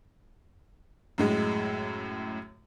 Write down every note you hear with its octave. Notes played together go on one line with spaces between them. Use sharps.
F#2 A2 G#3